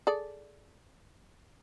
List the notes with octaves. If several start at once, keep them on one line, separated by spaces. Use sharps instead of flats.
G#4 A4 D5